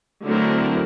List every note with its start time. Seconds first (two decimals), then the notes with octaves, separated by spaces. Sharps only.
0.24 D3 F#3 A3 C4 E4 A#4